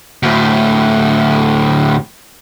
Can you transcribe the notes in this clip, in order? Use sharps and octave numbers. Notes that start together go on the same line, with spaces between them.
D2 A2